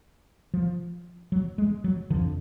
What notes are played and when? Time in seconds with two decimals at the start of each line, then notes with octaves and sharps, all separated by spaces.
0.54 F3
1.32 F#3
1.58 G#3
1.84 F#3
2.10 D3 F3
2.14 F2